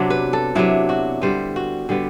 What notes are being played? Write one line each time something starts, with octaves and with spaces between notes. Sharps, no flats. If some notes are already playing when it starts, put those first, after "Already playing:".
Already playing: C3 F#3 B3 D4
B4
A4
C3 F#3 B3 D4 E4
F#4
D3 G3 B3 C5
F#4
D3 G3 B3